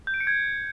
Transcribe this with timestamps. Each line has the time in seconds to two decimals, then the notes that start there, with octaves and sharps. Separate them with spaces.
0.07 G6
0.14 D7
0.20 C#7
0.27 G#6